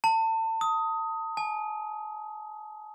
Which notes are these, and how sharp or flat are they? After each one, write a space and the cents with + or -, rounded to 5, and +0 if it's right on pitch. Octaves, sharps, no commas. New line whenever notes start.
A5 +30
D#6 +15
G#5 +45